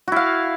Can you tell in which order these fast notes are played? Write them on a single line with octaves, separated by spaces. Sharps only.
F#4 E4 F5